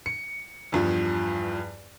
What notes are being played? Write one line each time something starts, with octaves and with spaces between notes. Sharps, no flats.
C#7
E2 G2 F3